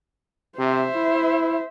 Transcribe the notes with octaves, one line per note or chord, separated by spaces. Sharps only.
C3 C5 E5
E4